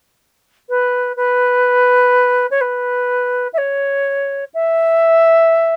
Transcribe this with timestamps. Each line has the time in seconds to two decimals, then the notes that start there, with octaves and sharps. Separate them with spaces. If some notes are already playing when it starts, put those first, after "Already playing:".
0.69 B4
1.16 B4
2.51 C#5
2.61 B4
3.53 E5
3.58 C#5
4.54 E5